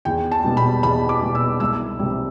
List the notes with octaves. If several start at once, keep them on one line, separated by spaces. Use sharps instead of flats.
E2 G5
A5
B2 G3
B5
E2 B5
D6
B2 G3
E6
C2 E6
C3 G3